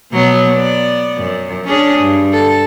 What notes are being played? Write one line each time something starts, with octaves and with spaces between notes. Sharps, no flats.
B2 F#3 B3
B3 D5
F#2
C#4 D4 G#4
G2
A4